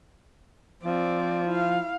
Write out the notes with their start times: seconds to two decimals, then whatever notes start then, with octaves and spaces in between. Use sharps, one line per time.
0.84 F3 C4 D5
1.47 E4 F5